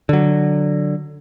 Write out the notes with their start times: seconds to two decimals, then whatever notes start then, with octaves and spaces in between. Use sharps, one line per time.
0.09 D3 F#3